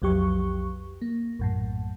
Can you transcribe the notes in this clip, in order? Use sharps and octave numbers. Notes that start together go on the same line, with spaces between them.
B1 F2 F#3 G4 C#6
A#3
A#1 F#2 A2